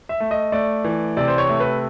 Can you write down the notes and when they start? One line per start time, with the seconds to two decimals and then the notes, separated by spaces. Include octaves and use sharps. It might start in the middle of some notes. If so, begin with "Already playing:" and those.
0.09 E5
0.20 A3
0.31 D#5
0.52 A3 D5
0.84 E3
1.17 C3 D5
1.28 C5
1.38 C#5
1.49 A3
1.60 B4